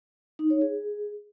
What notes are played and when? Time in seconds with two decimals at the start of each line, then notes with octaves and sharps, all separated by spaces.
0.39 D#4
0.50 C#5
0.61 G#4